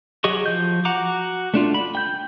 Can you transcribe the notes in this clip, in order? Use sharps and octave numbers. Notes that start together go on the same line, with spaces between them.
F#3 G4 G#4 D#5 C#6
F3 G6
F#4 F#5 A#5 D6
A3 D4 F4
B5
G5 G6